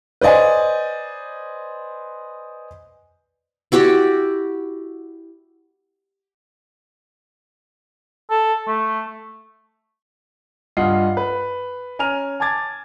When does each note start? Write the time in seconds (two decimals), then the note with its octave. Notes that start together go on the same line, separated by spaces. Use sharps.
0.21 B4 C5 D5 D#5 G#5
3.72 E4 F#4 G4 D5
8.30 A4
8.67 A3
10.77 G2 F4 D#5 F#5 C7
11.17 B4
11.99 C#4 G#5 A#5 F6 D#7 F7
12.40 G#5 A5 D6 G#6 A6